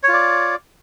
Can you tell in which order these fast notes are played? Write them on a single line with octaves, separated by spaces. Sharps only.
C#5 F4 D5